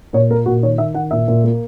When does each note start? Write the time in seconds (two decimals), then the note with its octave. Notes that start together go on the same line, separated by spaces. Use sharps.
0.13 A#2 C#5
0.30 A#3 A#4
0.46 A#2 F#4
0.62 D#3 C#5
0.78 D#3 E5
0.94 D#3 F#5
1.11 A#2 E5
1.28 A#2
1.44 A#3